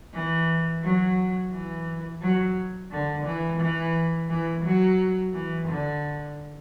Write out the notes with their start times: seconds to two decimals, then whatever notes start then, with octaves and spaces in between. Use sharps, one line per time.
0.14 E3
0.83 F#3
1.52 E3
2.22 F#3
2.91 D3
3.26 E3
3.60 E3
4.29 E3
4.64 F#3
5.33 E3
5.68 D3